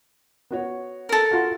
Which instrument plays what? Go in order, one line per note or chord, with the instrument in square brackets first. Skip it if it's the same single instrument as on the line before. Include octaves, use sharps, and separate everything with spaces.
[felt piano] B3 F#4 C#5
[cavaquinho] A4 A#4
[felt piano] F4 F#4 C6